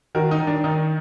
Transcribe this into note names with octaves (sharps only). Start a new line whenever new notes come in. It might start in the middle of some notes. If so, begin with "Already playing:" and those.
D#3 F#4 A#4
D#4
D#3
D4
D#3 D#4